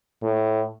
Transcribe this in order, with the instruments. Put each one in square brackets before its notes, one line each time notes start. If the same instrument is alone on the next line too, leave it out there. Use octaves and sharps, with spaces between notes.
[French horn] A2